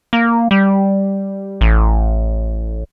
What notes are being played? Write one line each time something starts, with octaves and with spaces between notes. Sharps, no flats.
A#3
G3
A1